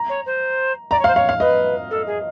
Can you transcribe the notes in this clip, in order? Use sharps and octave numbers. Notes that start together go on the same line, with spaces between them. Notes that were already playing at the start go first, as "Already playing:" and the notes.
Already playing: A#5
C#5
C5
D5 A#5
C#5
F5
C5
C#5 F5
F5
B4 D#5
A4
G#4